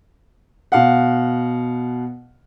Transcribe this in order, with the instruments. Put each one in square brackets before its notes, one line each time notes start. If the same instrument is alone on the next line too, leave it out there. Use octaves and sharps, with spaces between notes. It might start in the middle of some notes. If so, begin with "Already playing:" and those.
[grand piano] B2 F5 F#5